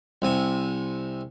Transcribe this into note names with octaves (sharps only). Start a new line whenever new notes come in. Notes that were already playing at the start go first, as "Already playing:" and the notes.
C2 C3 G#5